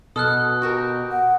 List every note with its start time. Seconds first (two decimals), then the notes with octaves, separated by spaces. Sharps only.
0.16 B2 A4 D#6 F6 F#6
0.62 F#4 G4 A#4
1.11 F#5